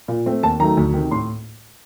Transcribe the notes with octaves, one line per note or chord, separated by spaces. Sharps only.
A#2
A3 C4
D#2 A5
D#3 F#3 A3 A#5
D2
C3 D#3
A2 C6